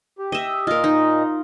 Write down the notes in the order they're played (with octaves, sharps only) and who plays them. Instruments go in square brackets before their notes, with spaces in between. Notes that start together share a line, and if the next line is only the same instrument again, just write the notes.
[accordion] G4
[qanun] D#5 E5
[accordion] A#2 D#5 [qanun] F4 A#4
[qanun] D#4